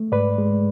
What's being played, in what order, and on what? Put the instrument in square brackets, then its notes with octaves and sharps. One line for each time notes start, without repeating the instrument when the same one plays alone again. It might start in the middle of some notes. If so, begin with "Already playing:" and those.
Already playing: [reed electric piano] A3
G#2 B4 D5
G#3